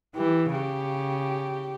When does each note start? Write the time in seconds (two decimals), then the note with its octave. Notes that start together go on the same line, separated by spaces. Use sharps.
0.15 E3 G4
0.51 C#3 G4